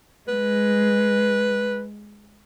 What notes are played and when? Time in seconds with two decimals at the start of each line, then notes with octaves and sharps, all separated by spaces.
0.28 G#3 B4